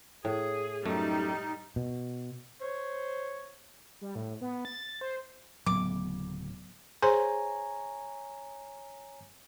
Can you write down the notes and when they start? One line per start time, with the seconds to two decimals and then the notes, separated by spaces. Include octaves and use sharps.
0.25 A2 G#4
0.85 F#2 G3 A3 D#4
1.76 B2
2.61 C5 C#5
4.01 G3
4.15 A2
4.41 B3
4.65 A6
5.01 C5
5.66 D1 A2 C#3 F#3 B3 D6
7.02 G#4 C5 C#5 G#5 A#5 C6